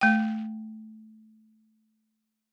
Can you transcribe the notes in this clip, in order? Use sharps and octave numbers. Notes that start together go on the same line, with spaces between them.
A3 G5